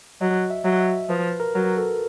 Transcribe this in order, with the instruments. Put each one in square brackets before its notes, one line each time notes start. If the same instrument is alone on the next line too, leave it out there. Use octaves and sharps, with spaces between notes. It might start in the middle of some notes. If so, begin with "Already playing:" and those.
[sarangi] F#3 [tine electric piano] D#5
[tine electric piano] E5
[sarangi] F#3 [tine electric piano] E5
[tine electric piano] E5
[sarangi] F3 [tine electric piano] B4
[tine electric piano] A#4
[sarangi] F#3 [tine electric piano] A#4
[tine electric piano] A4